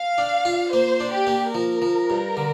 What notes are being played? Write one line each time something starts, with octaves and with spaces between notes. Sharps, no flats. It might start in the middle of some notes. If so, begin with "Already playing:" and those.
Already playing: F5
D4
F4
A#3 C5
D4
G4
A#3
F3 A#4
F3
G2
D3